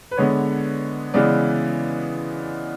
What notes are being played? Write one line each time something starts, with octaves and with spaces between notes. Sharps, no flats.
B4
D3 G#3 B3 C#5
C#3 E3 G#3 B3 D5